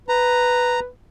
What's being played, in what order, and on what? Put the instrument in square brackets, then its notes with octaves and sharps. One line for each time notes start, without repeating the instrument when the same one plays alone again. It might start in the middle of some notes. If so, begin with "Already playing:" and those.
[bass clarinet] B4 [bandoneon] A#5